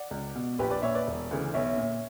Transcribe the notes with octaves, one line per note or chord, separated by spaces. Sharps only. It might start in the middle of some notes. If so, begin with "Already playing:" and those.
Already playing: D5 F#5
C#2
B2
A#1 G4 B4
B4 D5
A#2 C#5 E5
B4 D5
E1
D2 C#3 E3
B1 C#5 E5
A#2